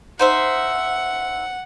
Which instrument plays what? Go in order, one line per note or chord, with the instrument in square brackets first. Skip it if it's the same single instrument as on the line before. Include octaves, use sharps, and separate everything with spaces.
[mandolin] D#4 C5 E5 [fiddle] F#5